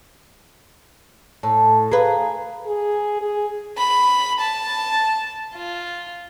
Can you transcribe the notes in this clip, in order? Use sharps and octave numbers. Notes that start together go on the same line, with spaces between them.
A2 A5
G#4 B4 F5 A#5
G#4
G#4
B5
A5
F4